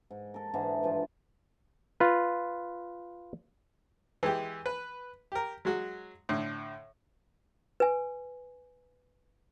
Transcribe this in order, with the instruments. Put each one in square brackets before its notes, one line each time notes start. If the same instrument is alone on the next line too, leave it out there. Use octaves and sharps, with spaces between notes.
[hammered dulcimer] G#2
A4 A#4
G#2 D3 E3 G#3
G2 F3 F4
[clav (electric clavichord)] F4 B4
[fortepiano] E3 G#3 G4
B4
G4 A#4
F#3 G#3 F#4
A2 D3
[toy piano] B4 G#5